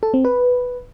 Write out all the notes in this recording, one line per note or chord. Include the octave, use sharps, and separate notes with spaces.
A4
C4
B4